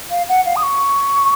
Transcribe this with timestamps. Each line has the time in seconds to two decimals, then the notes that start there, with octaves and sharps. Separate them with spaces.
0.11 F5
0.29 F#5
0.45 F5
0.56 D#6
0.63 C#6